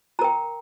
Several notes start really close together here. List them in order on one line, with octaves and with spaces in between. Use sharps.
A#5 A#4 G5